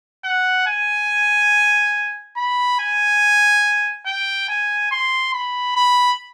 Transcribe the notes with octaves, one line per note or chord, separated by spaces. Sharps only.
F#5
G#5
B5
G#5
G5
G#5
C6
B5
B5